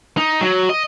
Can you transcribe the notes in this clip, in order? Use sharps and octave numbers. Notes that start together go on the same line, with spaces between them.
D#4
F#3
D#5